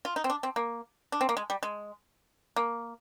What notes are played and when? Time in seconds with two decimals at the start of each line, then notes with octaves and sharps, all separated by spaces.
0.05 F4
0.16 D#4
0.24 C4
0.30 D4
0.43 C4
0.56 A#3
1.12 D4
1.21 C4
1.29 A#3
1.37 G#3
1.50 G3
1.63 G#3
2.56 A#3